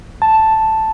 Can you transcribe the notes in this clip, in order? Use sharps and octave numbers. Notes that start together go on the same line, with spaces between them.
A5